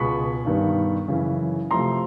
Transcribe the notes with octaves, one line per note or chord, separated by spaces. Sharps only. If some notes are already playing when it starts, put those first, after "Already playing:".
Already playing: C#2 B2 G#3 B5 C#6
G2 D#3 G3 B3
F#2 C#3 E3
C3 F3 A3 A#5 C6